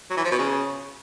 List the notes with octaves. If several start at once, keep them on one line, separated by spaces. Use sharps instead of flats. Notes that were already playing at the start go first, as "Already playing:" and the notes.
F#3
E3
F3
B2
C#3